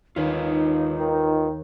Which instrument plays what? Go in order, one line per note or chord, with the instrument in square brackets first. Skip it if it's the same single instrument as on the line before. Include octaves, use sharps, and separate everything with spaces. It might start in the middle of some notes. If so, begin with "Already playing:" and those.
[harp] D#2 [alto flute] D#4 [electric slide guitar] F4 B4 C#5
[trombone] D#3